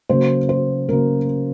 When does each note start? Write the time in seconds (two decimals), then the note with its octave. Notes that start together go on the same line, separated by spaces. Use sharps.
0.09 C#3 F#3 A#3 C5
0.49 C5
0.89 C#3 F#3 A#3 A#4